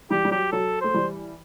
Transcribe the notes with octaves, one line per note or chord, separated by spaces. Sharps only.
E3 G3 G4
G3
F#3 G4
F#3 A4
A3 C5
E3 G3